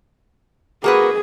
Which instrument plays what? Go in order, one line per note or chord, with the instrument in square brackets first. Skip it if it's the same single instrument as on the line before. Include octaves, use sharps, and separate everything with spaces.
[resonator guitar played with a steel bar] A#3 F#4 B4 [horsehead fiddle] G#4